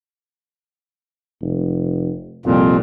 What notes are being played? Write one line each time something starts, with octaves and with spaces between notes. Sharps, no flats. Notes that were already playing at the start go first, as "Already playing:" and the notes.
F1
C2 F2 A#2